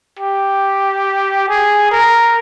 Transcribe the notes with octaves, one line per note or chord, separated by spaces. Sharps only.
G4
G#4
A#4